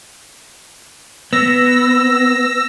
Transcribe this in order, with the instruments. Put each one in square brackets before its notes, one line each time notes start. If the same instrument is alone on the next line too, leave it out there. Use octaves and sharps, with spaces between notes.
[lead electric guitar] B3 [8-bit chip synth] E6 A#6